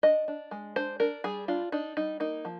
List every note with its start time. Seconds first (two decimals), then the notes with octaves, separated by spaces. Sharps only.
0.03 D4 D#5
0.28 D4
0.51 G#3
0.76 D4 C5
1.00 D4 A#4
1.24 G3 G#4
1.48 D4 F4
1.72 D4 D#4
1.97 G3 D#4
2.20 A#3 D#4
2.45 F3